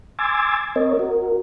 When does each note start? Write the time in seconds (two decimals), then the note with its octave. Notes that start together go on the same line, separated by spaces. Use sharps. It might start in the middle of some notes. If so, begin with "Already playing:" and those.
0.19 G#5 C6 D6 E6 G#6 A6
0.76 C4 A#4 C#5 D#5
0.99 F#4 A#4